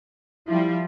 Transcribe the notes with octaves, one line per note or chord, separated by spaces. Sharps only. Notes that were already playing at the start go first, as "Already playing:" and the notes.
F3 G3 E4